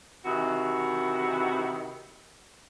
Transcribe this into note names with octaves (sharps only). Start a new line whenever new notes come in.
C3 D#3 E3 E4 F#4